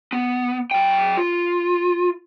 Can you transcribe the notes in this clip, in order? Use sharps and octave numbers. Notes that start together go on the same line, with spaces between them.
B3
F#3 G5
F4